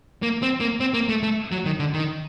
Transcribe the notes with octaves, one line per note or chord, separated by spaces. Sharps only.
A#3
C4
A#3
C4
A#3
A3
A3
F#3
D#3
D3
D#3